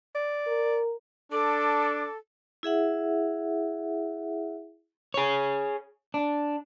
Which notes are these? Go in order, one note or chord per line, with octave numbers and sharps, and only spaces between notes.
D5
A#4
D4 A4 D6
E4 G#4 E5 F#5
G#4 C#5
D4